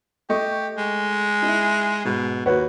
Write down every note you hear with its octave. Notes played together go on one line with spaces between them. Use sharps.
A3 G4 D#5 C#6
G#3
D#4 E4
G#2 B2
D#2 F#4 B4 C#5